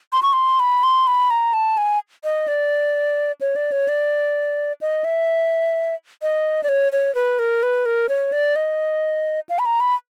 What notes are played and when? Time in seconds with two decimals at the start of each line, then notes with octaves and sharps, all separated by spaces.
0.13 C6
0.23 C#6
0.33 C6
0.60 B5
0.83 C6
1.07 B5
1.30 A#5
1.53 A5
1.77 G#5
2.24 D#5
2.48 D5
3.41 C#5
3.56 D5
3.72 C#5
3.88 D5
4.81 D#5
5.04 E5
6.22 D#5
6.63 D5
6.69 C#5
6.92 C#5
7.15 B4
7.39 A#4
7.63 B4
7.86 A#4
8.09 C#5
8.32 D5
8.56 D#5
9.49 F5
9.59 B5
9.66 A#5
9.80 B5